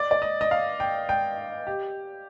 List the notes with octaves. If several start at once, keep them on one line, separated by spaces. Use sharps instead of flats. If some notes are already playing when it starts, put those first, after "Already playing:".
Already playing: D5
D5
D#5
D#5
F5
G5
G5
G4